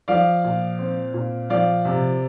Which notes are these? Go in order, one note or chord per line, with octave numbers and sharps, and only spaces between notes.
F3 D5 F5
A#2
C4
A#2
F3 D5 F5
C3